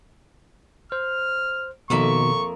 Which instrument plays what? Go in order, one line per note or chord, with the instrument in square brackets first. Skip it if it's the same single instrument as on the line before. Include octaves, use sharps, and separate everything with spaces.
[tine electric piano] C5 [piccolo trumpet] F6
[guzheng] F2 A#3 E5 [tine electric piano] B2 D#3 [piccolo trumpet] C#6